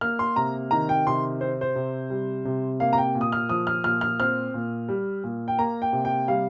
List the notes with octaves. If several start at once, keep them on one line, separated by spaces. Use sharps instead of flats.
A#3 F6
C6
C3 A#5
D#3 A#5
G5
C3 C6
C4 C5
C5
C3
G3
C3
A#3 F5
A#5
G5
A#2
D#6
F6
F3 D#6
F6
A#2 F6
F6
C4 F6
A#2
G3
A#2
G5
A#3 A#5
G5
C3
G5
G3 F5